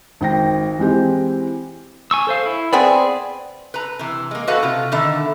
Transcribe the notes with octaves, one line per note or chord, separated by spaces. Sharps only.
G#1 G5 A#6
E3 G#3 C4 G4
G#5 C#6 E6
A4 C5 F5
E4
B3 C4 G#4 D5
B4 A#5
C3 E3
G#3 A#3
F#4 A4 B4 D#5 F5 F#5
C3 F4
B2 D3 D#3 E5